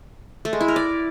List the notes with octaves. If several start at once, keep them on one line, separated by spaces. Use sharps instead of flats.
A3
G#3
E4
A#4
D5